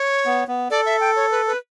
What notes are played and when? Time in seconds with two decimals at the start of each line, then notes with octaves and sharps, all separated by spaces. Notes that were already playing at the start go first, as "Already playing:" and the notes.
Already playing: C#5
0.25 B3
0.48 B3
0.70 A4 D5
0.86 E5
1.00 G5
1.16 C#5
1.31 B4
1.47 B4